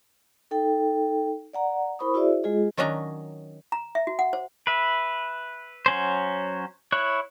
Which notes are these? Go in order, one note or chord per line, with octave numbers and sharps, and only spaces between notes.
D#4 A4 G5
D5 F#5 A#5
E4 A#4 C5 B5 C#6 D#6
E4 F#4 G#4 C5 D5 E5
G#3 F4 G#4 D#5
D#3 F#3 C#4 D4 D#5 A#5
A#5
E5
F#4
F#5
C5
B4 E5
F#3 C#4 C5
E4 C#5 F#6